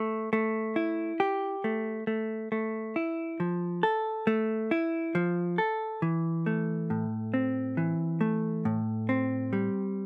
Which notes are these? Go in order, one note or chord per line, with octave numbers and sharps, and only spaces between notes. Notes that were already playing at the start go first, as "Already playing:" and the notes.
Already playing: A3
A3
E4
G4
A3
A3
A3
E4
F3
A4
A3
E4
F3
A4
E3
A3
A2
C4
E3
A3
A2
C4
G3